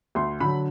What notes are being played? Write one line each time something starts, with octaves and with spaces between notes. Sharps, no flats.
D2 C6
D3 F#3 B5